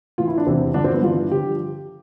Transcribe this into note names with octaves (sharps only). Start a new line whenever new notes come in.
A2 E3 F4
E4
D4
E2 C3 E3 C4
G2 D3 F3 D4
C4
B3
G2 E3 F4
D3 F3 G4